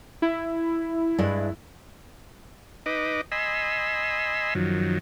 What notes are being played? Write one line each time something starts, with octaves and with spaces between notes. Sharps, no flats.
E4
G2 G#3 D4
D#4 B4 D#5 D6
D#5 G#5 B5 C6 E6
F#2 D#3 F3 F#3